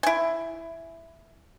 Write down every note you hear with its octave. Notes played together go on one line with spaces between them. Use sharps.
E4 G#5